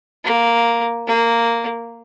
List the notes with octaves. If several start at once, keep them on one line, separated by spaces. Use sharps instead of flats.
A#3
A#3